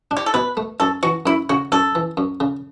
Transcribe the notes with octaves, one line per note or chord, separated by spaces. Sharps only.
D4
G4
A4
B2 B4
A3
F#2 A4
E3 F#4
F#2 E4
C#3 F#4
F#2 A4
E3
F#2
C#3